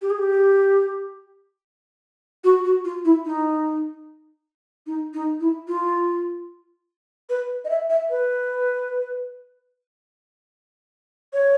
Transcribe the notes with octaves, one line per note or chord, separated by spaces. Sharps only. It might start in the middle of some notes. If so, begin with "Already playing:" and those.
G4
G#4
G4
F#4
F#4
F4
E4
D#4
D#4
D#4
E4
F4
B4
D#5
E5
E5
B4
C#5